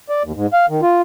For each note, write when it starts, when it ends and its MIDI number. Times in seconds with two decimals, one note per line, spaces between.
0.09 0.23 74
0.24 0.32 39
0.35 0.47 44
0.53 0.66 77
0.69 0.81 51
0.82 1.02 65